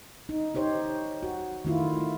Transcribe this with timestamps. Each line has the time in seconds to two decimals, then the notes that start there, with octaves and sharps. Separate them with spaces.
0.29 D#4
0.55 D#4 G4 C5 C#5
1.23 F#4
1.65 D#3 A3 E4 F4